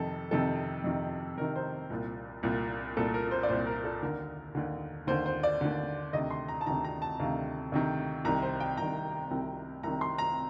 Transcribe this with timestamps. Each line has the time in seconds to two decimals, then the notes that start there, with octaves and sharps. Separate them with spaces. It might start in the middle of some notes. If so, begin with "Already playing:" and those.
Already playing: F2 C3 D#3 A4
0.31 F2 C3 D#3 A4
0.84 F2 C3 D#3
1.37 F2 C3 D#3 A#4
1.56 C5
1.90 C2 A#2
2.43 C2 A#2
2.97 C2 A#2 A4
3.14 A#4
3.31 C5
3.43 D5
3.49 C2 A#2 C5
3.67 A#4
3.84 A4
4.02 D#2 D3 A#4
4.55 D#2 D3
5.07 D#2 D3 C5
5.26 C5
5.43 D5
5.61 D#2 D3
6.13 D2 C3 D#3 D#5
6.30 C6
6.48 A#5
6.61 A5
6.66 D2 C3 D#3 A#5
6.84 A#5
7.02 A5
7.20 D2 C3 D#3 F5
7.72 D2 C3 D#3
8.25 C2 C3 D#3 A#5
8.42 C5
8.60 G5
8.77 C2 C3 D#3 A#5
9.31 C2 C3 D#3
9.83 C2 C3 D#3 A#5
10.01 C6
10.18 A#5